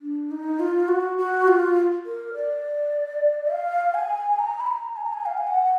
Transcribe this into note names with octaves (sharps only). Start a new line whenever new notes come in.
D4
D#4
F4
F#4
F#4
F4
A#4
D5
F5
G#5
A#5
B5
A#5
G#5
A#5
G#5
F5
G#5
F#5